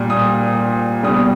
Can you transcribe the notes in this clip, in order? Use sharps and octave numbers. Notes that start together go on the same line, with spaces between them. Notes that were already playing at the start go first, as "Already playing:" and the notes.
Already playing: A#2 G3
D#6
B2 G3 D#6